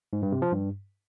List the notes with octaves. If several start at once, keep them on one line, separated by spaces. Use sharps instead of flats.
G#2
G2
C3
F3
G2